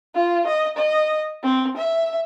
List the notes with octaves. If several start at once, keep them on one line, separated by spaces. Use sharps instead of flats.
F4
D#5
D#5
C4
E5